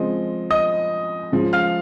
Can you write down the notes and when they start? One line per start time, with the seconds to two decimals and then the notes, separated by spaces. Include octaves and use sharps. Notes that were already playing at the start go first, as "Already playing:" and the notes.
Already playing: C#3 F3 G#3 C4 D#5
0.50 D#5 D#6
1.32 C#3 F3 G#3
1.53 F5 F6